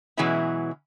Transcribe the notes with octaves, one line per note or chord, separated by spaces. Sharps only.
B2 E3 F#3 G#3 C#4 E4